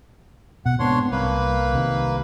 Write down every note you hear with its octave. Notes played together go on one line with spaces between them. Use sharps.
B2 F#5
G#2 B3 C4 D4 C#5 C6
C2 A#3 B4
C2 C3 D#3